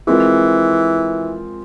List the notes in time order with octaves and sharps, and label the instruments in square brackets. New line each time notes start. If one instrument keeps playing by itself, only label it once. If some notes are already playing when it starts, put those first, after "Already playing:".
[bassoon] E3 [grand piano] G#3 C4 F4 A#4